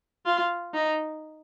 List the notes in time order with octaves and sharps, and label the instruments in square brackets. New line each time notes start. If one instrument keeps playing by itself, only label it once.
[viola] F4
D#4